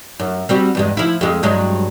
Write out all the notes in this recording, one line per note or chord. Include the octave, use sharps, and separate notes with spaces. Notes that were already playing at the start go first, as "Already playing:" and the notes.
F#2
G3 C4 F#4
E2 G2 G#3
F3 E4
F2 G#3
G2 F#3 G#3